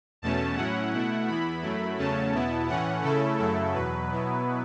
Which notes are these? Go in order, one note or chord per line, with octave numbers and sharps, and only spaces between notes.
E2 B2 A3 C#4 A5
A2 F#3 C#4 E4 F#5
B2 A3 E4
E2 E3 B3 E4 B5
F#2 F#3 A3 E4
E2 C#3 F#3 A3 C#4 A5
E2 B2 B3 E4
A2 E3 A3 C#4 F#5
C#3 A3 C#4 E4 A4
F#2 C#3 F#3 A3 E4
E2 B2 F#3 B4
B2 F#3 B3 E4